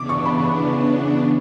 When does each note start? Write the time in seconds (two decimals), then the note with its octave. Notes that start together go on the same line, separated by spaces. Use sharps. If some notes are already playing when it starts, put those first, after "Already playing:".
Already playing: C#3 E3 B3 D4 D6
0.09 C#6
0.25 B5